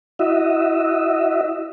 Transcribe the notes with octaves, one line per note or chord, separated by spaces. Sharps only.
E4 F#4 D#5 E5